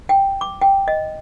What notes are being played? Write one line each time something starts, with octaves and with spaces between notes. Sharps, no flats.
G5
D6
G5
D#5